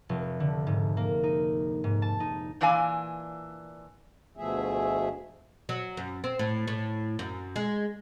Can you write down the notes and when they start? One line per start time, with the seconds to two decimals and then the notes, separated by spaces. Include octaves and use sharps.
0.09 F1
0.40 D3
0.67 G#2
0.97 A#3
1.23 D#4
1.84 G#2
2.02 A5
2.20 D#4
2.61 A#2 E3 D4 F5 G#5
4.37 D2 B2 F3 A3 G#4 E5
5.69 F#3
5.97 F#2
6.24 C4
6.39 A2
6.67 A2
7.19 F#2
7.56 G#3